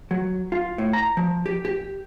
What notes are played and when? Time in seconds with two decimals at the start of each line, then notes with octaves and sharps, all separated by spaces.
0.11 F#3
0.52 F4
0.78 A2
0.93 A#5
1.17 F3
1.46 G4
1.65 G4